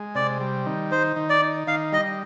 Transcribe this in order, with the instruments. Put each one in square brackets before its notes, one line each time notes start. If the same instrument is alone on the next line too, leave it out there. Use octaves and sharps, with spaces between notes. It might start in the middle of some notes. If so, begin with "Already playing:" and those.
Already playing: [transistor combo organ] G#3
[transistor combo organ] C3 [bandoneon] D5
[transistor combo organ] G3
D#3
[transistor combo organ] D#4 [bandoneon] C5
[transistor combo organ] D#3
[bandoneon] D5
[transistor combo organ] D#4
[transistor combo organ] D#3 [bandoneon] F5
[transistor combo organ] G3 [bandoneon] D#5